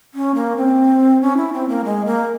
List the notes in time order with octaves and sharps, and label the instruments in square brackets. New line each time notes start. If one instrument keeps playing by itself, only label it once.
[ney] C#4
A#3
C4
C#4
E4
C4
A#3
G#3
A#3